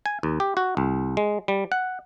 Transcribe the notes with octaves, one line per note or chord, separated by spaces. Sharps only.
G#5
D#2
G4
F#4
C2
G#3
G3
F#5